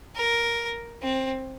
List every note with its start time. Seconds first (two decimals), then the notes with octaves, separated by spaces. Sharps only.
0.16 A#4
1.03 C4